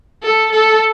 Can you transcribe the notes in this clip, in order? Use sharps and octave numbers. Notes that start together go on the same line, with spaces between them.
A4
A4